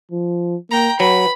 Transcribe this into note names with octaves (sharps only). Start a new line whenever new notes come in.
F3
A#3 G5 A#5
F#3 B4 B5